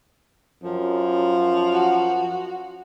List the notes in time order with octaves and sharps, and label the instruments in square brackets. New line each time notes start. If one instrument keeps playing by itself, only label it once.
[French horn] F#2 [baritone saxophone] F3
[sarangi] F#4